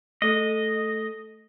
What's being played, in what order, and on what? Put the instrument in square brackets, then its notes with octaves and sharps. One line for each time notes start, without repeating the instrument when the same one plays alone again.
[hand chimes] A3 A4 D#6 [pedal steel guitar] D#5